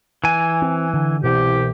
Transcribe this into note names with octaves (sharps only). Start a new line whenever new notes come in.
E3 G#5
C4
D3
C2 B2 E3 G4